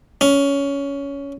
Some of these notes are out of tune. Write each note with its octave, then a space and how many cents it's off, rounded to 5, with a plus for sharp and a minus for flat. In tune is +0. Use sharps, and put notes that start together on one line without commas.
C#4 +15